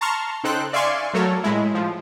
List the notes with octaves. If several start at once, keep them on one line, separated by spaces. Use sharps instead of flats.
A5 A#5 C6 C#6 F6
C#3 D#4 A4 C5 G5 F#6
D5 E5 F5 G#5 C6 C#6
F#3 A3 A4 A#4 C#5
A2 G#3 E4
F3